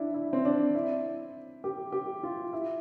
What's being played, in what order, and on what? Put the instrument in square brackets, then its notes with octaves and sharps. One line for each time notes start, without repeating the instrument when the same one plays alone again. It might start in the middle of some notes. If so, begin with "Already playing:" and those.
Already playing: [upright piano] D4 E4
E4
C4
D4
E4
G4
G4
F4
E4